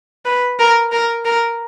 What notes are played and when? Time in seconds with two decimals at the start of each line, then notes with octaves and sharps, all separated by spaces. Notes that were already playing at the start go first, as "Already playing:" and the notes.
0.25 B4
0.59 A#4
0.92 A#4
1.25 A#4